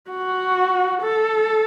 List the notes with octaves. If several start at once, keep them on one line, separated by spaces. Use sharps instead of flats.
F#4
A4